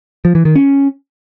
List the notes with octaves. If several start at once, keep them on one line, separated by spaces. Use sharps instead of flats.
F3
E3
D#3
C#4